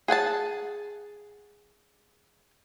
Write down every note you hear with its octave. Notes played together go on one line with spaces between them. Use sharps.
G#4 F#5 G#5 A5